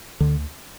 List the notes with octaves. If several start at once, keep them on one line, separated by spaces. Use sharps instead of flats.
D2 D3